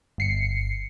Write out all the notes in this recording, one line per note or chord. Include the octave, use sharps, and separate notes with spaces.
G1 C7 C#7